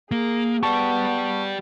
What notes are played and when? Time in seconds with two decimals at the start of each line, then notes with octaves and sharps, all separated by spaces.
0.11 A#3 G#4
0.63 B3 G4 D5 A5 C#6